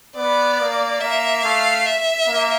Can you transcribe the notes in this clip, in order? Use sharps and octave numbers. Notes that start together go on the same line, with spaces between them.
B3 D5
A#3
A#3 E5
A3 F5
E5
A#3